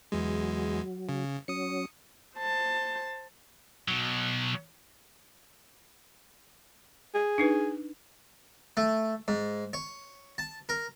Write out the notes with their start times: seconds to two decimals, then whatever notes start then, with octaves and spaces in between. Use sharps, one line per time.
0.12 E2 F#3 G#3
1.09 C#3
1.48 F#3 C#4 D#6 C#7
2.36 C5 A5
3.88 B2 F#3
7.14 G#4
7.38 D4 D#4 B4
8.77 A3
9.28 G#2
9.73 C#5
10.38 A5
10.69 A#4